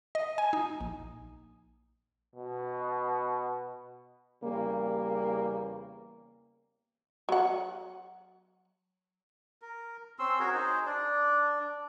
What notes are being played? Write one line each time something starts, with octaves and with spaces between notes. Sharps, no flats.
D#5
G#5
D#4
A#1
B2
E2 C#3 G3 A#3
F#3 F#5
A#4
C4 C#4 C6 E6
F#4 G#4 A#4 C#5
D#4 G#4 C5
D4 D5